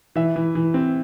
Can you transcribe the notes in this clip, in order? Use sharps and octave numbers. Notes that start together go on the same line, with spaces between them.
E3 E5
E3
E3
C4